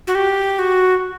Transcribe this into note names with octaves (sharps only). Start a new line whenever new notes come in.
F#4
G4
F#4